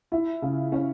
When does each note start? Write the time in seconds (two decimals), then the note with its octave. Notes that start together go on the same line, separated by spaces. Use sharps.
0.12 E4
0.42 C#3
0.72 C#4